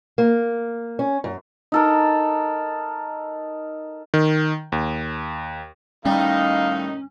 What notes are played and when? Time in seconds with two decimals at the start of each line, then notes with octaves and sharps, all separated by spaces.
0.18 A#3
0.99 C#4
1.24 F#2
1.72 D#4 A4 A#4
4.14 D#3
4.72 D#2
6.06 A2 D#3 G3 C#4 D#4 F5